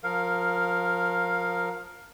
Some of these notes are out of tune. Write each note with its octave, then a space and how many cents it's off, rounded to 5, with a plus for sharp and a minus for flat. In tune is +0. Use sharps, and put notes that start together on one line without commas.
F3 +25 A#4 +0 F5 +10